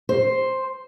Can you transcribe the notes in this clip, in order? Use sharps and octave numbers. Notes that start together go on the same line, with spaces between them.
C5